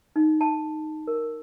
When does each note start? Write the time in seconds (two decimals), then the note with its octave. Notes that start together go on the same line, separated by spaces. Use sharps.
0.16 D#4
0.41 A5
1.07 A#4